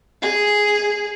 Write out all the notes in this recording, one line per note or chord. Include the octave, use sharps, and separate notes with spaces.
G#4